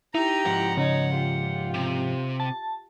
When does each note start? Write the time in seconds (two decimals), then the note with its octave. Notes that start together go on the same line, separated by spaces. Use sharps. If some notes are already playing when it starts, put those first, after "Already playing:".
0.15 D#4 E4 G4 A#5
0.46 G#2 F3 F#5
0.77 C#3 D#4 C#5
1.14 F4 G4
1.74 C3
2.40 A5